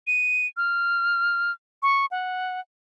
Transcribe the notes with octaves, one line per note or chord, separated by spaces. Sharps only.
D#7
F6
C#6
F#5